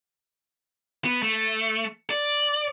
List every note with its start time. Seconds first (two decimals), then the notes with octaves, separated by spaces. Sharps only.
1.05 B3
1.23 A3
2.10 D5